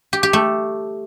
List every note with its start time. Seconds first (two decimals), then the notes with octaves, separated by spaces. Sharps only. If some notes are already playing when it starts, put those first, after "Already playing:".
0.13 G4
0.23 G4
0.33 A3